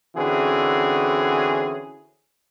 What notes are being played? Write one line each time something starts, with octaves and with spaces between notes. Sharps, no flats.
D3 E3 C4 C#4 F#4 G#4